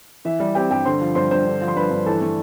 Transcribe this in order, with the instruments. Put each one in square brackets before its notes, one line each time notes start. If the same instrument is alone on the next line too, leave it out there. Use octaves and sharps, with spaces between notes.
[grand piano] E3 E5
G3
C4 G4 G5
G2 G4 G5
D3 C5 C6
F3
G2 C5 C6
G2 C5 C6
D3
F3
C6
G2 B4 B5
G2
E3 A4 A5
A3